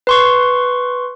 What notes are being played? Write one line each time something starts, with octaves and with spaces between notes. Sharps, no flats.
B4 C6 C#6